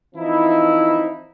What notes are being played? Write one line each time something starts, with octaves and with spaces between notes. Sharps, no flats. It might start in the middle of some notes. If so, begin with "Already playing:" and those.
E3 F3 C4 D#4 E4